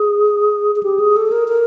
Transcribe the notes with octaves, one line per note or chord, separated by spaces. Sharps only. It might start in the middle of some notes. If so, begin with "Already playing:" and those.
Already playing: G#4
G#4
G4
G#4
A4
A#4
A#4